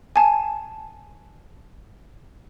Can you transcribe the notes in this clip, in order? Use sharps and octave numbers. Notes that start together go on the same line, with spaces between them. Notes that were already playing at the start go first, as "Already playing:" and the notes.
G#5 A5